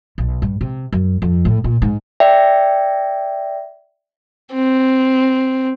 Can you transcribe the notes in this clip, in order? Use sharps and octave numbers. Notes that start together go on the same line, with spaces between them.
B1
G2
C3
F#2
F2
A2
A#2
G#2
D5 E5 G5
C4